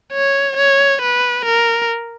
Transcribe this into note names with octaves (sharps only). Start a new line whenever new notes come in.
C#5
C#5
B4
A#4